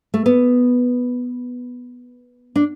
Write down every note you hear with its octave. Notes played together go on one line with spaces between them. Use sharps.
A3
B3
D4